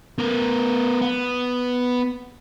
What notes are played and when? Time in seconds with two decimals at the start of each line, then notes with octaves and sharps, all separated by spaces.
0.18 B3 A#4
1.02 B3